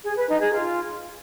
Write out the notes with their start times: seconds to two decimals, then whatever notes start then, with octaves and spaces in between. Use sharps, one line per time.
0.05 G#4
0.17 B4
0.29 D#4
0.41 G#4
0.53 F4